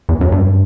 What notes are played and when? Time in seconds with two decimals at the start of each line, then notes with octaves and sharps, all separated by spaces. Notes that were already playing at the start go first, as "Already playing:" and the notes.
0.09 E2
0.21 F#2
0.32 G2